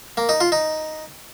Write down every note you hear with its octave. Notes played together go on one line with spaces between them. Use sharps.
A#3
D#4
F4
D#4